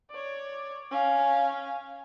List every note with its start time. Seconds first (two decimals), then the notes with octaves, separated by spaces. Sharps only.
0.10 C#5 D5
0.91 C#4 F5